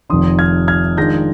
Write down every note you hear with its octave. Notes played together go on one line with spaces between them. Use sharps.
F1 F2 D#3 C6 D#6
F6 G#6
F6 G#6
F2 D#3 G#3 D4 F4 G6 A#6